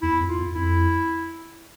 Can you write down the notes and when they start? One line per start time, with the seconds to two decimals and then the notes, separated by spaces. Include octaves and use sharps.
0.02 E2 E4
0.20 F2
0.29 F4
0.38 F2
0.55 F2 E4